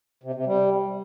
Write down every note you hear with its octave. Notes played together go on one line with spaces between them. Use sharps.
C3
C3
G3